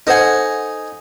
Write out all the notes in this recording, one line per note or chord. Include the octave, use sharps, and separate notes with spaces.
D#4 A4 C5 F#5 G#5